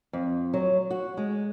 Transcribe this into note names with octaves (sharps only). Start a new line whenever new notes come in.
F2
F#3
F#4
G#3